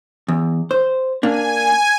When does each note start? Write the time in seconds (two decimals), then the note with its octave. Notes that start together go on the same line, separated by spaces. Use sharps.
0.28 E2
0.71 C5
1.23 A#3 D4 G#5